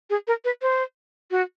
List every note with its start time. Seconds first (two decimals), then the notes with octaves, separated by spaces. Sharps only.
0.10 G#4
0.27 A#4
0.45 B4
0.62 C5
1.31 F#4